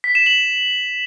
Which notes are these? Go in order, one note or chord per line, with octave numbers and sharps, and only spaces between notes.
B6
E7
F#7